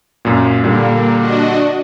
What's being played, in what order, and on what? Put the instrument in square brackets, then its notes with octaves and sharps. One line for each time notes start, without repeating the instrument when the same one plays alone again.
[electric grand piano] F#2 A#2
[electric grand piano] A#2 D3 G3 [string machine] A#3
[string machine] D4 F#4 D#5